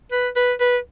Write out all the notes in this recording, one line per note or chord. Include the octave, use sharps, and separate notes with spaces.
B4
B4
B4